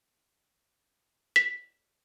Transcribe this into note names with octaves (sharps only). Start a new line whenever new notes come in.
B6